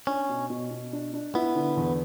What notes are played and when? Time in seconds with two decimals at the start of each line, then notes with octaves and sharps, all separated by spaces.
0.07 C#4 D4
0.29 B2
0.50 B2
0.71 B2
0.93 D4
1.13 D4
1.35 B3 E4
1.55 D3
1.77 E2